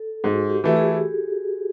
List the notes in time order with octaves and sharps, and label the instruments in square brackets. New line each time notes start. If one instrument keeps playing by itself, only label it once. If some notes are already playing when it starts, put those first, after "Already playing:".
Already playing: [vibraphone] A4
[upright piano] G#2 [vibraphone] F#4
[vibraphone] G4
[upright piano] E3 A3
[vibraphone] G#4